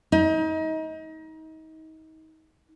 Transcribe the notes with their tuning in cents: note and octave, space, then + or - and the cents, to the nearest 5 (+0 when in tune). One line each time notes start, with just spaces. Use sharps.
D#4 +30